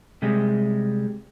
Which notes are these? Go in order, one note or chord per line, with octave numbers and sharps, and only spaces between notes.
C3 G3 G#3